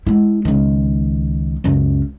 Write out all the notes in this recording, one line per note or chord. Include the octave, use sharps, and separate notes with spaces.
G#3 E4
C#2 D#3
C#2 F#2